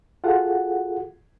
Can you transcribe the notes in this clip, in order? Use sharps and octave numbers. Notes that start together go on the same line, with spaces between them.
F4 F#4 G#4 A4 F#5